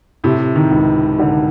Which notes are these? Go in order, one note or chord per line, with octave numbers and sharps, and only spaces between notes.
A2 C3
D#3
C#2
D3 D#3